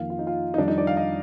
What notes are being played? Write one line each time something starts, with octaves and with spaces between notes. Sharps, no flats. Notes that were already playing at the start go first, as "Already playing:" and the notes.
Already playing: F2 D#3 A#3 F5
F4
D#4
F4
D#4
F2 D#3 G3 D4
D#4
D5
F5
D#5